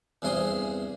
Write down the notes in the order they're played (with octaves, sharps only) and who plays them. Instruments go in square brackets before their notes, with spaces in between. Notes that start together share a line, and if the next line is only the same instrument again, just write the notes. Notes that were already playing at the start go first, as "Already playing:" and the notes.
[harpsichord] E2 G2 C3 G#4 C6 D#6